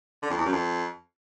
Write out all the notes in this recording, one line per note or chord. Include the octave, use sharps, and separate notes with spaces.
D3
F2
E2
F#2
F2